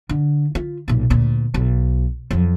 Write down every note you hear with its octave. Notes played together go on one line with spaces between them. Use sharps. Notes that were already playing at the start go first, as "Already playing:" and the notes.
D3
F4
B1 A#2
D2 A#2
B1
F2 F#3